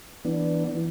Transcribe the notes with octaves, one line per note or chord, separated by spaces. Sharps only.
E3 B3 D4
E3